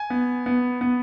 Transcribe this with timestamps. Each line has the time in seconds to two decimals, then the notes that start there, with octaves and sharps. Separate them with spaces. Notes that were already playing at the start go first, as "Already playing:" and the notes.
Already playing: G#5
0.10 B3
0.46 B3
0.81 B3